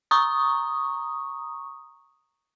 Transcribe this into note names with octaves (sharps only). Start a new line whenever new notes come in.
A#5 C#6 D#6